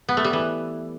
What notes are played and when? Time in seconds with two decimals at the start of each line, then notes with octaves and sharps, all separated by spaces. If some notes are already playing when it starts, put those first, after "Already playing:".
0.09 B3
0.17 A3
0.24 G3
0.33 E3